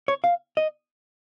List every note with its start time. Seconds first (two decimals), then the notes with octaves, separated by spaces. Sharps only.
0.08 C#5
0.24 F5
0.57 D#5